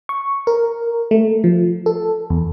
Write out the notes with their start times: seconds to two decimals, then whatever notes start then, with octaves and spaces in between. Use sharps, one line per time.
0.09 C#6
0.47 A#4
1.11 A3
1.44 F3
1.86 A4
2.30 E2